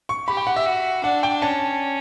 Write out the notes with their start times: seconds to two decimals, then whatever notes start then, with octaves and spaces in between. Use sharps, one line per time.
0.09 C#6
0.28 G4 B5
0.37 G5
0.47 F#5
0.56 E5
0.66 F#4
1.04 D4 F#5
1.23 G5
1.42 C#4 A5